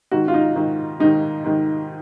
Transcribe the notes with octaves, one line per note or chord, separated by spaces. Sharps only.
G#2 D#3 F#4
F4
D#4
G#2 D#3
G#2 D#3 D#4
G#2 D#3